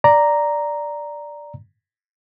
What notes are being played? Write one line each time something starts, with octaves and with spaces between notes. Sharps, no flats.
D5 A#5